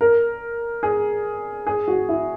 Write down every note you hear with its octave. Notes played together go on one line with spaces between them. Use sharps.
A#4
G#4
G#4
F#4
E4